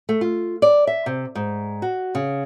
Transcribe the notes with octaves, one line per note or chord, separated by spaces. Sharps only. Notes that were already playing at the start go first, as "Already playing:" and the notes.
A3
F4
D5
E5
C3
G#2
F#4
C#3